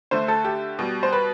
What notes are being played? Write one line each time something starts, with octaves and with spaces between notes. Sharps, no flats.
D3 A3 C5
A4
G4
B2 G3
C5
B4